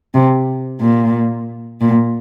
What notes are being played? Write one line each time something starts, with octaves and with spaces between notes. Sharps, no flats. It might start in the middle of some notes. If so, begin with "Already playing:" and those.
C3
A#2
A#2